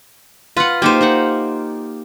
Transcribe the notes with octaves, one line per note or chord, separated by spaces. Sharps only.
F4 B4 F#5
A#3 D#4 G4 C5
D#4 A#4 F#5